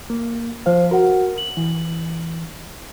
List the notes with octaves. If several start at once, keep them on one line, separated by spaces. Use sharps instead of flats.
A#3
F3 C5 F5
F#4 A#4 F#5
F#7
E3